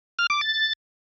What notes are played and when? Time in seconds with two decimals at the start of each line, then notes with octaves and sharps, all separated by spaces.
0.19 F6
0.30 D6
0.41 A6